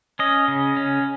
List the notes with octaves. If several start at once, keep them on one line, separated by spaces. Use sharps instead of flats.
C#4 D#5
C#3
C#4